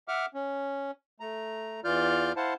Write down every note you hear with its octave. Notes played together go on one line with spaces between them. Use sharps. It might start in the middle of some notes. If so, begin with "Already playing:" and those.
E5 F#5 D6 F6
C#4
A3 A#5
E2 E3 F4 D5 F6 G6
E4 C5 F5 F#5 A5